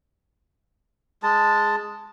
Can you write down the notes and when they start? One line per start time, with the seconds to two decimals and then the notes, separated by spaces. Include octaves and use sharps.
1.23 G#3 A5